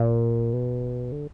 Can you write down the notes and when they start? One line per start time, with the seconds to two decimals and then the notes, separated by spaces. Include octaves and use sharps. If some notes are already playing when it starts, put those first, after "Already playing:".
Already playing: A#2
0.53 B2
1.12 D3